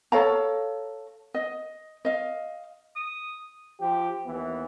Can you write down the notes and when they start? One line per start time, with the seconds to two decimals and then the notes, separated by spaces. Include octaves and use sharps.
0.12 A4 C#5 F5 A#5
1.34 D#5
2.05 D#5 F5
2.96 D#6
3.79 F3 G4
4.26 D#2 E3 B3